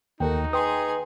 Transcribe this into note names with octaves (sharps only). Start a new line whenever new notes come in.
D#2 D#4 F#4 A4 A#4 G5
G#4 B4 G5 G#5 C6 D#6